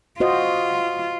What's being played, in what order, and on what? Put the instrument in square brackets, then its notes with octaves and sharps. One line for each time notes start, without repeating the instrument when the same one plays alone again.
[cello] F4 [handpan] F#4 C5 D#5